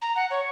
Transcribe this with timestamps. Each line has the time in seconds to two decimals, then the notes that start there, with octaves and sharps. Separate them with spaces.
0.02 A#5
0.16 F#5
0.30 C#5